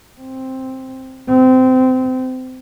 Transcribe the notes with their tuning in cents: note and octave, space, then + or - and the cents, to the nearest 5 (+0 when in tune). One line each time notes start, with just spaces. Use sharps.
C4 +5
C4 -25